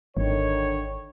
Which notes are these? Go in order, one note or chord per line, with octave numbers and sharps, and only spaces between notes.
G#1 D3 D#3 C#5